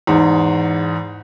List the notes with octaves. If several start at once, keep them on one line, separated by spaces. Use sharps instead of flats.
E2 G#2